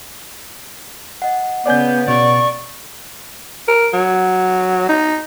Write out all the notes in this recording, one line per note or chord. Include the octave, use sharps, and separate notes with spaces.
D#5 F#5
C#3 B3 B4 C#5 D5 F#5 G#5 G6
B2 D5 C#6
A#4
F#3
D#4